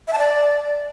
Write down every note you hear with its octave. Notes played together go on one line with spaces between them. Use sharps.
E5
A5
D5